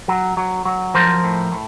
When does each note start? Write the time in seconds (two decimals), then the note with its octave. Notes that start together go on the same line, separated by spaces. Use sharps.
0.08 F#3
0.37 F#3
0.65 F#3
0.94 F3 A#4 C5
1.24 A2
1.52 A2